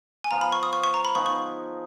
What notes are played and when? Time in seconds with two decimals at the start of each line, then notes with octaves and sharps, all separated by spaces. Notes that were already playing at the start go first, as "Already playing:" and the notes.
0.24 G#5
0.31 F3 B3 F4 A#5
0.41 B5
0.52 C#6
0.63 D#6
0.73 C#6
0.84 C#6
0.94 A#5
1.05 B5
1.15 F3 B3 D#4 G#4 C#6
1.26 C#6